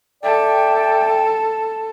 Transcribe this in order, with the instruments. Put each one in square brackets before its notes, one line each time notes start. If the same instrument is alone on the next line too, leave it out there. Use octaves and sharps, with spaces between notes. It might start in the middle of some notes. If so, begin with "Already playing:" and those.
[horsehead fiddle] A4 [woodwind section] D5 E5 G5